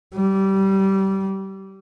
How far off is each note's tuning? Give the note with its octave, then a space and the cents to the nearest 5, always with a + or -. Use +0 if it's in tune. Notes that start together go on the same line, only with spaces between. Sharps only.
G3 -20